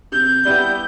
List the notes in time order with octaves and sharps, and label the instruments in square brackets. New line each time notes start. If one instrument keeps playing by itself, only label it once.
[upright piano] C3 [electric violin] G6
[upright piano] G3 B3 E4 G4